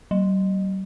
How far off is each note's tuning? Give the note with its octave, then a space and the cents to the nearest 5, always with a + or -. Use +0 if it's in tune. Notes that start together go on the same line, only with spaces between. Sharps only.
G3 -45